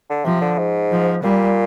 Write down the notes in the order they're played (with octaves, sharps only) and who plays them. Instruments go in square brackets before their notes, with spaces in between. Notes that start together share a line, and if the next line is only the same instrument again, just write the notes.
[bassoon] D3
[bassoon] C3 [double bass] F3
[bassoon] D3
G#2
[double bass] F3
[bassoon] A#2 [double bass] G3